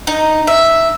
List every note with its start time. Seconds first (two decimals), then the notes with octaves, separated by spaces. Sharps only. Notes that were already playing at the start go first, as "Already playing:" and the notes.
0.07 D#4
0.47 E5